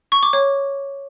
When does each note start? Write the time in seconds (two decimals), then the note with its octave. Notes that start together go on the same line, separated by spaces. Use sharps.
0.12 C#6
0.23 D6
0.33 C#5